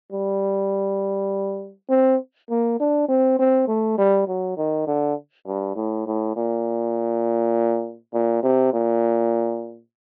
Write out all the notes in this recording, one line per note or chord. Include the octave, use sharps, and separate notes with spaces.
G3
C4
A#3
D4
C4
C4
A3
G3
F#3
D#3
D3
G2
A2
A2
A#2
A#2
C3
A#2